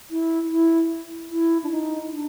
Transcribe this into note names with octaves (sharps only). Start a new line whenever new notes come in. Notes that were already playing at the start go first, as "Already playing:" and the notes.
E4
E4
E4
D4
D#4
D4